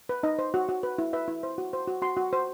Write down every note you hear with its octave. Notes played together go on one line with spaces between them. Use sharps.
B4
D#4 D#5
C5
F#4
F#4
B4
E4
B4 E5
E4
C5
F#4
C5
F#4
F#4 C6
F#4
C5